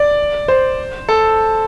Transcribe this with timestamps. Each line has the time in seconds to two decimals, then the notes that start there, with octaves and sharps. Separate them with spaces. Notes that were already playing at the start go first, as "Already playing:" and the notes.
Already playing: D5
0.48 C5
1.09 A4